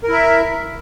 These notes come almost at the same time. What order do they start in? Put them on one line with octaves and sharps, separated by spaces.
A#4 E4 E5